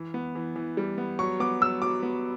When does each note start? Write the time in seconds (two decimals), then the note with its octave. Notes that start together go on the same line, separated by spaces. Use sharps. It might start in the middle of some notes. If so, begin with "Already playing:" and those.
Already playing: E3
0.14 B3
0.35 E3
0.56 E3
0.77 G3
0.98 B3
1.19 F#3 C#6
1.40 B3 D6
1.61 F#3 E6
1.82 F#3 D6
2.03 B3